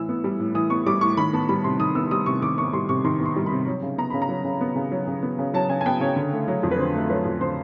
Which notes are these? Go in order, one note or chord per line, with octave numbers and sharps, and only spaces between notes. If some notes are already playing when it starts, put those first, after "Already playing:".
Already playing: A2 E3 E6
B3
G3
A2
E3 D#6
B3 C#6
G3 D6
A2 C#6
D#3 B5
B3 A5
G3 B5
C3 C6
D#3 D#6
B3 E6
G3 D#6
C3 C#6
D#3 D6
B3 C#6
G3 C6
C3 C#6
D#3 C6
B3
C6
G3
B5
C3
F#3
C#3
B3 A#5
C#3 B5
A#5
F#3
C#3
B3
C#3
F#3
C#3
B3
C#3
F#3 A5
C#3 G#5
G#5
B3 G5
C#3 C#5
D3
A3
F#3
F2
B4
D3 C5
A3
F#3 B4
F2
D3 C5